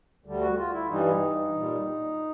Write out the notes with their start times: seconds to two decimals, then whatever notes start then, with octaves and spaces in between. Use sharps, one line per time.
0.25 D2 D3 G3
0.41 F#4
0.57 F4
0.73 E4
0.89 G2 E3 G3 D#4
1.54 A#2 G3